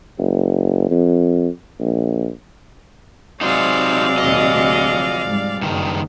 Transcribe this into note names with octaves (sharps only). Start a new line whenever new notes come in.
F#1
F2
A#1
C3 F#3 G#3 D#4 F#4 C5 D5 F5
D#2 A#2 D#5
D2
F3
G#2 G3
F#1 G2 D#3